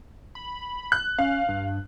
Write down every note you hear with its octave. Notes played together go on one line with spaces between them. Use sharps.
B5
F#6
C#4 F5
G2